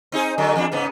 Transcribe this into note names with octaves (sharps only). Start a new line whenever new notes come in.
C4 D#4 G#4
D3 F#3
E2 D4
G#2 C#3 B3